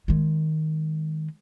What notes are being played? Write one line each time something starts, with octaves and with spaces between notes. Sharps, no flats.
D#3 G#3